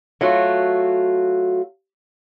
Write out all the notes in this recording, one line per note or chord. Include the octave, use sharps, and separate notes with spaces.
F#3 A3 F4 F#4